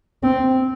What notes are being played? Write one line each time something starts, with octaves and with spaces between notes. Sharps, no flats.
C4